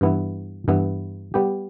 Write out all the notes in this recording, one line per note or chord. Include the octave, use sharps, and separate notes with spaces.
G2 E3 B3 E4
G2 E3 B3 E4
G3 B3 G4